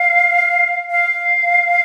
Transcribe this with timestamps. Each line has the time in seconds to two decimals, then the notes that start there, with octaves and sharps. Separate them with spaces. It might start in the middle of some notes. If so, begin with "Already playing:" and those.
Already playing: F5
0.90 F5